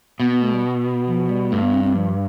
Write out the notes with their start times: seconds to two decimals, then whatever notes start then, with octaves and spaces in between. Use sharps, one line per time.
0.20 B2 B3
0.31 B3
0.42 A3
0.53 G3
1.07 F3
1.30 G3
1.51 G2 A3
1.62 B3
1.73 C4
1.84 C4
1.95 F3